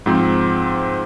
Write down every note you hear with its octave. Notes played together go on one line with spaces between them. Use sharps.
G#2 F3 C4